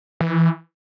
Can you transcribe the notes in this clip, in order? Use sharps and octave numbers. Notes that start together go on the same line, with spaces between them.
E3